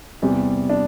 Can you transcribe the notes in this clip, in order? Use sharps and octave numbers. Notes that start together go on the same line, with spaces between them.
E2 C3 G3
D4